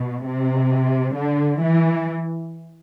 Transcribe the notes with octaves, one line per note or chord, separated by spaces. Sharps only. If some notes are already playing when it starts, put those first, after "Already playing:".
Already playing: B2
C3
D3
E3